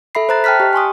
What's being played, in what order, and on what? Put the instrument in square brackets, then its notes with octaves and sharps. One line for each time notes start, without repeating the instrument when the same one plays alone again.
[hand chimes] A4 E5 B5 C7
C5 E5 A#5 F#6 A6
G5 A5 F6 F#6 B6
G4 D#5
G#5 C6 C#6 D#6